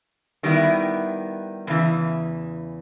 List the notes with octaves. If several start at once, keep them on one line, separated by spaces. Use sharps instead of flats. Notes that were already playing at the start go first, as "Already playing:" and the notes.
D#3 G3 B3 E4
E2 C#3 E3